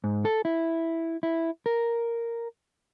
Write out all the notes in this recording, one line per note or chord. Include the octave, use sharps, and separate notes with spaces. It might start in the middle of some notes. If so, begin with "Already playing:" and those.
G#2
A4
E4
E4
A#4